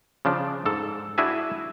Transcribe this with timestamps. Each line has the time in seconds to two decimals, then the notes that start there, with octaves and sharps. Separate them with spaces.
0.25 C#3 F3 D4
0.66 G#2 A4
1.18 D4 E4 F#4 G#4 E5 G#5